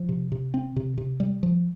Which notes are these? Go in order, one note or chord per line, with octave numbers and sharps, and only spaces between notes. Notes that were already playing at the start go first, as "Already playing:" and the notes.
Already playing: F3
C3
C3
C4
C3
C3
G3
F3